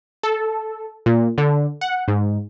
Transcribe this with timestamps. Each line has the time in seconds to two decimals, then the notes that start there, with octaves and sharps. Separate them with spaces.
0.23 A4
1.06 A#2
1.38 D3
1.81 F#5
2.08 G#2